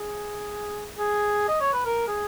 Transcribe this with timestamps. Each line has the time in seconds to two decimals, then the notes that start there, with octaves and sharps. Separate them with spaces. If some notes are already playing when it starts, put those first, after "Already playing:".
Already playing: G#4
0.98 G#4
1.48 D#5
1.61 C#5
1.73 B4
1.85 A#4
2.08 G#4